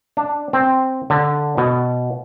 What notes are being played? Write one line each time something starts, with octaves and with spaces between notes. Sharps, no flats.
D4
C4
D3
B2